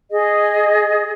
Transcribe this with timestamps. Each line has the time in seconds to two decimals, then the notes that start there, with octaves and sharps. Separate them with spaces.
0.11 G#4 D#5